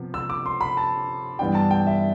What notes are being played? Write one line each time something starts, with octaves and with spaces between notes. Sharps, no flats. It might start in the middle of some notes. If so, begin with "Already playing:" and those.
Already playing: C3 F3 B3
E6
D6
C6
B5
A5
G2 E3 G3 B3 D4 G5
A5
G5
E5